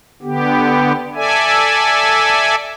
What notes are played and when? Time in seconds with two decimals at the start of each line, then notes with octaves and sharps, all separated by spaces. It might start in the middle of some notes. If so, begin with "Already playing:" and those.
0.23 D3 B3 G4
1.15 A4 D5 E5 G#5